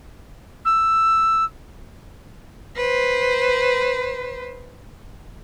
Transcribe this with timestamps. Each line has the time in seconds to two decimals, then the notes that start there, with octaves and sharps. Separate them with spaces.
0.65 E6
2.77 B4 C5